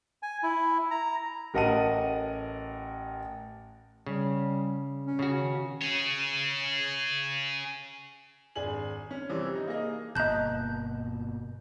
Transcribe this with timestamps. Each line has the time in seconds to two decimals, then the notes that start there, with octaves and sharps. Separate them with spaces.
0.23 G#5
0.43 E4
0.91 A#5
1.54 A1 A#4 D#5 F#5 A5 D#7
4.07 C#3 G3
5.07 C#4
5.19 C#3 F#4
5.40 D#3
5.82 G#4 C#5
8.56 G#1 D4 G#4 G#5 F#7
9.11 C#4
9.29 C3 E3 F3 G3
9.55 D#4
9.67 A#3 G#4 D#5
10.15 G1 B2 A#3 D#5 A5 A#5 F#6 G6